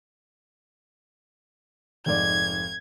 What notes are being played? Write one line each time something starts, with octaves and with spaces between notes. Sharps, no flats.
F1 G#2 D5 G#6